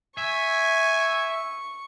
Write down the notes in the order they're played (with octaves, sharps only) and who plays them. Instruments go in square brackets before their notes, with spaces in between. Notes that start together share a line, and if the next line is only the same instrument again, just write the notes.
[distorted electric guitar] E5 [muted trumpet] G#5 [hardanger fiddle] C#6